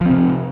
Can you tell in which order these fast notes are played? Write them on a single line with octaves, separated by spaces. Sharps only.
F3 C4 C3